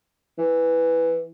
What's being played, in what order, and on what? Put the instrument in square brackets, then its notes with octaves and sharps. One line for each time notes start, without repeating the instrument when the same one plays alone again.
[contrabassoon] E3